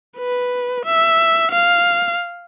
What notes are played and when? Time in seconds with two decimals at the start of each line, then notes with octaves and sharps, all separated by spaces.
0.18 B4
0.85 E5
1.52 F5